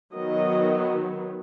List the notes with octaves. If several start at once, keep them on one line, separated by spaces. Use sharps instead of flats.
D#3 F#3 B3 D#5